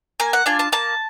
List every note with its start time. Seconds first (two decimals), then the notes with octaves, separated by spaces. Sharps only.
0.20 A#3 G#5
0.33 F#5
0.46 D4 F4 G#5
0.59 A5
0.72 A#3 A5